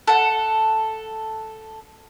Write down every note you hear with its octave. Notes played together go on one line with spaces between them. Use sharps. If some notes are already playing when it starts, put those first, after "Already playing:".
A4 F#5